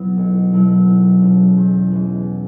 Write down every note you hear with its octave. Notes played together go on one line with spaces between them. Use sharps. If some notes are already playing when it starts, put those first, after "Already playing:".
Already playing: E1 B2 F#3 B3 E4
B1
B2 F#3 E4
B1
B2 G#3 C#4
E2
E3 G#3 B3 F#4